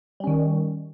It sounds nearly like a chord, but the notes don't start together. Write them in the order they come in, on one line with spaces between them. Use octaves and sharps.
G3 C#4 D#3